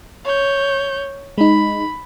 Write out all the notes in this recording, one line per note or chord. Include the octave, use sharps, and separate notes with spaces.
C#5 G6
G#3 D#4 B5